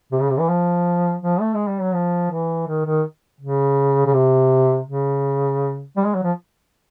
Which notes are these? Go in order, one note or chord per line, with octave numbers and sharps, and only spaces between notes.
C3
C#3
C3
E3
F3
F3
A3
G#3
G3
F#3
F3
E3
D#3
D#3
C#3
C#3
C3
C#3
G3
G#3
F#3
F3